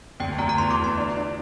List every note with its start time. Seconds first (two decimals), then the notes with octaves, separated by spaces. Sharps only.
0.20 D2 G5
0.38 D2 A#5
0.49 A#5
0.58 E2 C6
0.71 D6
0.77 E2
0.84 C6
0.97 D4
1.17 D4